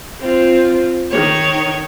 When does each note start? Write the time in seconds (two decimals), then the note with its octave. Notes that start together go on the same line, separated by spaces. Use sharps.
0.21 C4 F4
1.11 D#3 C#5